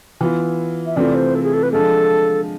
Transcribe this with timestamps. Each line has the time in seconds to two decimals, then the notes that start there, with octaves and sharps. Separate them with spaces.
0.21 E3 B3 F4
0.86 E5
0.96 C3 E3 A3 C4 F4 D5
1.15 C5
1.35 A4
1.43 G#4
1.54 A4
1.63 B4
1.72 D3 F3 G#3 A4